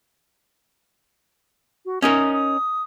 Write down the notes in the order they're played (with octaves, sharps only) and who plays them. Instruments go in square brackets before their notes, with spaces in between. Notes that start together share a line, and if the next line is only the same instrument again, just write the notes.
[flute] F#4
[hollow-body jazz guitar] C#4 D#4 A#4 [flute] D#6
[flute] D#6